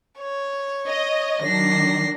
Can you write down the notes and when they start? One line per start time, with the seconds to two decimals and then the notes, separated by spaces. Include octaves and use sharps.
0.19 C#5
0.87 D#5
1.42 D#3 F#3 D4 A#6 C7